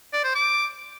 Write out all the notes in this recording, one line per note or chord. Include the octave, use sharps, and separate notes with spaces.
D5
C5
D6